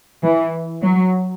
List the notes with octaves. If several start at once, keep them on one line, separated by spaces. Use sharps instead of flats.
E3
F#3